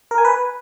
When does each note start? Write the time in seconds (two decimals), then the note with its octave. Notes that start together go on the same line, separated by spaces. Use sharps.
0.11 A#4
0.18 G#5
0.25 B4